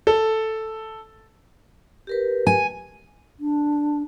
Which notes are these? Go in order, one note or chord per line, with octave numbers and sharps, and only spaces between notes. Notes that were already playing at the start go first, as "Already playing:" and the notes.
A4
G4 A#4 B4
G#5
D4